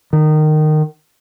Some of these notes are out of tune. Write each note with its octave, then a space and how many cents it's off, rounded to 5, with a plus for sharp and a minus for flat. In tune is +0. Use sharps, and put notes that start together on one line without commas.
D#3 -20